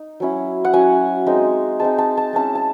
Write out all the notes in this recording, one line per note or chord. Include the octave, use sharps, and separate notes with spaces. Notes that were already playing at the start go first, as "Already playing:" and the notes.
Already playing: D#4
F#3 C#4 E4
F#5
F#3 C#4 E4 G#5
G#3 C4 D#4
G#3 C4 D#4 A5
A5
A5
G#3 C#4 E4 A5
A5